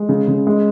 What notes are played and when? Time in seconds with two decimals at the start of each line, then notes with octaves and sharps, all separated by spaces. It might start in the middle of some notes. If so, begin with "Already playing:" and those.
Already playing: G#3
0.09 C#3
0.28 C#3
0.47 G#3